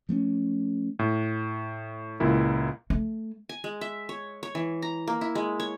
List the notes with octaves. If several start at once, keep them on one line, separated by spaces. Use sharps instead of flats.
F3 A3 B3 C#4
A2
C#2 A#2 E4 A#4
A3
G#5
G#3
E5
C#5
C#5
E3
A#5
A#3
E4
G#3
C#5